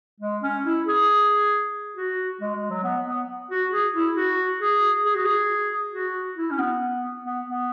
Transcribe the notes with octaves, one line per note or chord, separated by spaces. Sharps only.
G#3
C#4
E4
G#4
F#4
G#3
G#3
F#3
B3
B3
F#4
G#4
E4
F#4
G#4
G#4
F#4
G#4
F#4
E4
C#4
B3
B3
B3